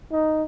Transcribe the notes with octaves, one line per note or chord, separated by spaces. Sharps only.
D#4